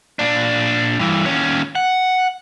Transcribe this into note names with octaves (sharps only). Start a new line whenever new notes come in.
A#2 D4
G2 E3
D#2 C#4
F#5